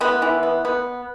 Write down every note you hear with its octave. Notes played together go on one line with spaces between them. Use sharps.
E3 B3
E3
B3
B3